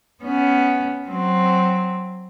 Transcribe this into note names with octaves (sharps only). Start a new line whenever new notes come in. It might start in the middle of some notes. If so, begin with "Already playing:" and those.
B3 C#4
F#3 C4